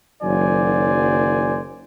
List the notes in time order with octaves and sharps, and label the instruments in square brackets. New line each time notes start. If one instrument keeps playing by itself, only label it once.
[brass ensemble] F#1 D#3 F#3 C5 D5 G#5